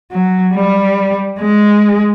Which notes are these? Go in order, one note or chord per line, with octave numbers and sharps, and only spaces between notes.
F#3
G3
G#3